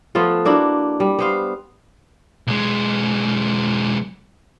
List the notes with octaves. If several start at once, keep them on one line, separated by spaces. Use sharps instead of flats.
F3 A3 B3 F4
A#3 D4 E4 F#4
G3
B3 C5 F5
B1 G#3